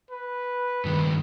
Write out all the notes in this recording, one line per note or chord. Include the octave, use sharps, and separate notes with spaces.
B4
G2 D#3